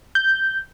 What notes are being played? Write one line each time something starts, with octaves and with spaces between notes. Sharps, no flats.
G6